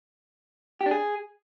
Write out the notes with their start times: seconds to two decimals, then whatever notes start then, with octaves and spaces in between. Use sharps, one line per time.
0.81 G4
0.86 D4
0.91 G#4